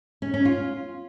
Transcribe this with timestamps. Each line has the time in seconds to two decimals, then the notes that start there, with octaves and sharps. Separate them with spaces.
0.22 C#4
0.34 C#4
0.45 F4